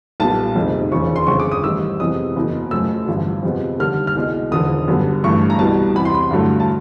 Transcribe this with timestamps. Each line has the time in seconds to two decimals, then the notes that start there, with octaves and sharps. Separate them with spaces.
0.20 B1 A#2 G3 B3 A5
0.56 F1 F2 C3 D#3 G#3
0.92 E1 D#2 C#3 F3 C#6
1.16 C6
1.27 G1 F2 C#3 C#6
1.40 D6
1.52 D#6
1.63 A1 G#2 D#3 G3 E6
2.00 F2 C3 E3 G#3 B3 D#6
2.36 F#1 E2 B2
2.71 F#2 C#3 F3 A3 E6
3.07 A1 G2 D3 F3
3.43 F2 C3 F3 G#3 B3
3.79 D#2 D3 G3 A#3 F6
4.07 F6
4.15 C2 B2 G#3
4.51 E1 D#2 D3 F3 D#6
4.88 G1 F#2 D3 G3 B3
5.24 A1 G2 E3 A3 C#6
5.50 A#5
5.59 C2 B2 G3 B3 A5
5.95 E2 C3 E3 B5
6.05 C6
6.15 B5
6.31 G2 D3 F#3 A3
6.60 A5